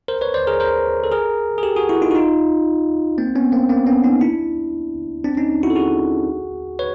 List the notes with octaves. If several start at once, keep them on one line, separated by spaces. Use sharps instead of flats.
A#4 C5
B4 C#5
C5 D5
G#4 A#4
A#4 C5
A4
G#4 A#4
G#4
G4 A4
F#4 G#4
E4 F#4
D#4 F4
F#4
D#4 F4
A#3 C4
B3 C#4
A#3 C4
A#3 C4
B3 C#4
C#4 D#4
D4 E4
C4 D4
C#4 D#4
E4 F#4
A4
F#4 G#4
B4 C#5